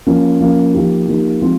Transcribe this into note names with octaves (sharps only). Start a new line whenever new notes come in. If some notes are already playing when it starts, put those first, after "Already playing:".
F3 A#3 C#4
F3 A#3 C#4
F3 A#3 D#4 G4
F3 A#3 D#4 G4
F3 G#3 C4 F4